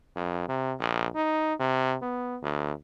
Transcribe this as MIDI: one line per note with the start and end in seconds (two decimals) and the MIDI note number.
0.16 0.44 41
0.49 0.74 48
0.80 1.07 34
1.15 1.54 63
1.59 1.96 48
2.02 2.37 59
2.43 2.73 38